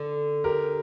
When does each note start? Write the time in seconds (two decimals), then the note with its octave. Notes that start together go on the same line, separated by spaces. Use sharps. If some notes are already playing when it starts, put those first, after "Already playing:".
Already playing: D3 A4
0.44 G4 A#4